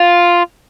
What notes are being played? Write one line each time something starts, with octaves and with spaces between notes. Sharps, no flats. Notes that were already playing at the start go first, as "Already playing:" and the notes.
Already playing: F4